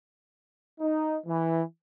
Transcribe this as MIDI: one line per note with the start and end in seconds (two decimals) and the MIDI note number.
0.80 1.18 63
1.26 1.62 52